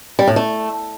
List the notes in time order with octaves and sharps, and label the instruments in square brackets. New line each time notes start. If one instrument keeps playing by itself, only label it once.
[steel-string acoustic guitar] G3
A2
A3